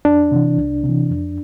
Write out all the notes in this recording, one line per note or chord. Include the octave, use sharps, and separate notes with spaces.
F2 D4
C3 E3
C2
C3
E3
F2